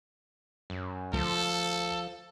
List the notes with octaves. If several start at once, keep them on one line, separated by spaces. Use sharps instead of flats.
F#2
D2 F3 A4